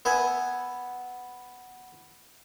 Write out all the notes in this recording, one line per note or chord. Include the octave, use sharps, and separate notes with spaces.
B3 E5 G#5